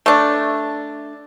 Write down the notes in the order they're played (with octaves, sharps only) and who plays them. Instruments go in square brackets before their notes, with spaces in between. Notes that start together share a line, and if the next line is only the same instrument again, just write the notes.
[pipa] A3 D4